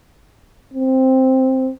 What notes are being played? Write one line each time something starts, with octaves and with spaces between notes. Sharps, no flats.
C4